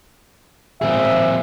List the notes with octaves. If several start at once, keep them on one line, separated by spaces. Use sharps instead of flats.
A#2 F3 G#3 C4 G#4 E5